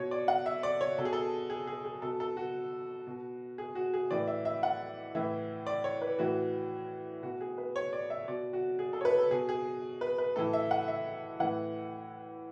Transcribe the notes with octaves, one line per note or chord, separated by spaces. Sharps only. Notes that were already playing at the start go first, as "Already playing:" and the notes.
Already playing: B2 C#5
D5
F#5
E5
D5
C#5
B2 A4
G#4
A4
G#4
G#4
G#4
B2 A4
A4
F#4
B2
G#4
F#4
G#4
A2 E3 D5
E5
E5
F#5
A2 E3 E5
D5
C#5
B4
A2 E3 F#4
B2 F#4
G#4
B4
C#5
D5
E5
B2 D5
F#4
G#4
A4
C#5
B4
A4
B2 G#4
G#4
B4
B4
A2 E3 A4
E5
F#5
E5
A2 E3 F#5